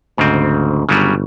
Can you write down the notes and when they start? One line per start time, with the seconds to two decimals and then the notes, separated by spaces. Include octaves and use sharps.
0.18 D2 G#2 C#3 C4
0.89 G1 C#3 F#3 G3